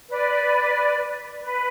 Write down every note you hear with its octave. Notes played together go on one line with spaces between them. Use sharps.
B4 D5
B4